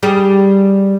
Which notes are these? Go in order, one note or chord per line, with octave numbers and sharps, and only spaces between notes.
G3 G4 G#4